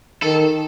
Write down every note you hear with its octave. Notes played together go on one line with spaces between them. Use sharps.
D#3 A4